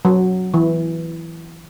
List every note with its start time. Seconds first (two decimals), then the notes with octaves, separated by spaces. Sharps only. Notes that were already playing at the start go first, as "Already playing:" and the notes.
0.05 F#3
0.54 E3